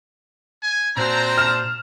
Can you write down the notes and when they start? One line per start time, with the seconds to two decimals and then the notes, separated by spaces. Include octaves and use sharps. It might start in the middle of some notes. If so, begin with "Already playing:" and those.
0.62 G#5
0.97 A#2 C4 D4 F#4 C5 A#5
1.38 F6 E7